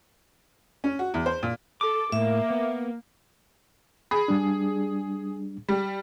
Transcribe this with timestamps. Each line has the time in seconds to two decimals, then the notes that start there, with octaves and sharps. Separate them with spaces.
0.84 C#4
0.99 F#4
1.14 E2
1.26 C5
1.43 A#2
1.81 A4 D6
2.12 A2 A#3 E5
2.50 B3
4.11 G#4 B5
4.28 G3 D4
5.69 G3